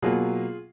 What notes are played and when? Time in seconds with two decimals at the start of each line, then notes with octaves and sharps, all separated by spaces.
0.02 B2 F#3 A#3 F4 G#4